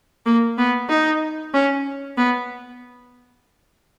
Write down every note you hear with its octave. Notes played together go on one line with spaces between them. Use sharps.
A#3
B3
D#4
C#4
B3